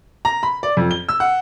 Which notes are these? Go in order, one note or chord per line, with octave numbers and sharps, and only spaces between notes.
A#5
B5
D5
F2
G7
E6
F#5